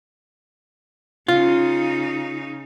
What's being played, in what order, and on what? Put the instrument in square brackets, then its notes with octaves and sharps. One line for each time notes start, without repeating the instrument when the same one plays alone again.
[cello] C#3 D#4 [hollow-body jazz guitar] F4